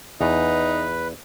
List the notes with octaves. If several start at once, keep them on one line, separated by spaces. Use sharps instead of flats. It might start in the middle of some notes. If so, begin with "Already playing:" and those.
E2 D#4 B4